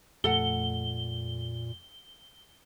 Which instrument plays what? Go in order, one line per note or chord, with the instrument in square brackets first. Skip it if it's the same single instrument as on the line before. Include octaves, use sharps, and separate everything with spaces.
[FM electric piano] F2 A3 [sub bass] A#2 [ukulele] A4 F#5 [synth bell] G7